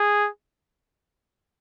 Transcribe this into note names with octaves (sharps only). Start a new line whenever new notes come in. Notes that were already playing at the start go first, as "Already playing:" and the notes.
Already playing: G#4